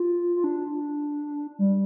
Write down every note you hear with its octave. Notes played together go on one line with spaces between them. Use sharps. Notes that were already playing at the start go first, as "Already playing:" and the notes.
Already playing: F4
F4
D4
G3